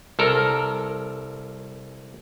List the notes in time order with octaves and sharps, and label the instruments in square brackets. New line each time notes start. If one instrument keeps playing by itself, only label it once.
[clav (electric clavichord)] C2 A4 A#4